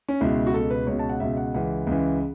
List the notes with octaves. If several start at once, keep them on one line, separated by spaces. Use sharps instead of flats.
C#4
C#2 B2 E4
F#4
C#2 B2 A4
B4
C#2 B2 C#5
A5
F#5
C#2 B2 E5
F#5
C#2 C#3 E3 F#5
C#2 C#3 E3